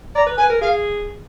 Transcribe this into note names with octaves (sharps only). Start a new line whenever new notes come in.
D5 A#5
B4
B4 G#5
A#4
G#4 F5